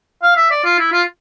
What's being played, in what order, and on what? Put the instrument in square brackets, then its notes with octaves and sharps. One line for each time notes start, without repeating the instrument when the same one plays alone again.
[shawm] F5
E5
D5
F4
E4
F4